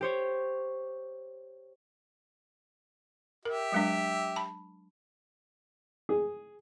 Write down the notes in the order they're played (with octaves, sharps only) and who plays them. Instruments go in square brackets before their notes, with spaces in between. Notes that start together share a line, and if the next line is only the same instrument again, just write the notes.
[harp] G4 C5 C#5
[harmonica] G4 E5 [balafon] A#4
[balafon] F#3 G#3 D4
A5 B5
[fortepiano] G#4